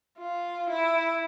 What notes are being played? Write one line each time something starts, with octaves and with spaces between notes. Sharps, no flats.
F4
E4